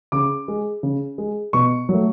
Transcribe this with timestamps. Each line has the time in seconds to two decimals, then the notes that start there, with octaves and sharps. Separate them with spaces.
0.12 C#3 D6
0.48 G#3
0.83 C#3
1.18 G#3
1.53 B2 C#6
1.89 F#3
1.94 A3